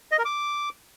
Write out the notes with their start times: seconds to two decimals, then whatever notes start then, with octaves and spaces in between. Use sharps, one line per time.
0.12 D#5
0.18 A#4
0.25 D6